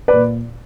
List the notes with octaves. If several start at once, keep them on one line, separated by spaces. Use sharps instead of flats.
B4 D5
A#2